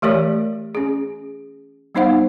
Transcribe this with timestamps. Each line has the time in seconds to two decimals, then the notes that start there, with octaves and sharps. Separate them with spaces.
0.02 E3 A3 G4 A#4 C#5 D5
0.75 C#4 G#4
1.95 G3 B3 D#4 C5 F5 F#5